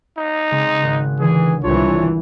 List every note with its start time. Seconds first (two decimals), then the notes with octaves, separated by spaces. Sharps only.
0.18 D#4
0.51 C#3 G#3 C4
0.83 G#1 F#6
1.20 D3 E3 G#4
1.63 C2 E3 D4 F4 C#5